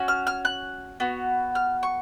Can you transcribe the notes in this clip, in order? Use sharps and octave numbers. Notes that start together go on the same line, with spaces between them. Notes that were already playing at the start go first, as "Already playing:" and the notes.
Already playing: C#4 F#4
F6
F6
F#6
B3 F#4
F6
C#6